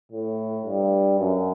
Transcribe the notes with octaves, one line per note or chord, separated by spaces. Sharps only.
A2
G2
F#2